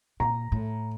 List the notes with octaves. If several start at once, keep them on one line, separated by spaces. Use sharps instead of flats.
A#2 A#5
A2